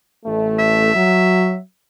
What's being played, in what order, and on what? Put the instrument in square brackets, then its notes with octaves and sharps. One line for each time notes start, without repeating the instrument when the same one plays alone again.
[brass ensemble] A1 A3
[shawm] E5
[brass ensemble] F#3